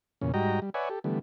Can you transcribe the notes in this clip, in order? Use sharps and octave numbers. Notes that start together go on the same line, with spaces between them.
E2 A#2 C#3 C#4
G#2 G3 F#4 D#5 G5 A#5
G3
B4 C#5 D5 E5 F#5 G#5
G4 A4
D3 E3 G3 A3 B3